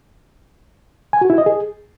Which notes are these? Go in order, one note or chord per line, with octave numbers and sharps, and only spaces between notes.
G#5
F#4
E4
D#5
G#4